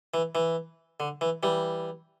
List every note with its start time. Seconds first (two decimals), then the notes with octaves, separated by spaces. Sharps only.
0.14 E3
0.35 E3
1.00 D3
1.21 E3
1.43 E3 G3